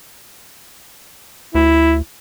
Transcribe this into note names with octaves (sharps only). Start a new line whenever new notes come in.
D2 E4